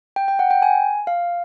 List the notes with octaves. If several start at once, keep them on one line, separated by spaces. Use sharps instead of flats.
G5
G5
F#5
G5
G#5
F5